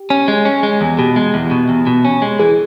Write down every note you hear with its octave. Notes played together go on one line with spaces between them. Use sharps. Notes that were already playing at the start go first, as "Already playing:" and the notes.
Already playing: G4
C#4
G#3
C#4
G#3
E2
B2 G4
G#3
E2
B2
E2
B2
C#4
G#3
E3 G#4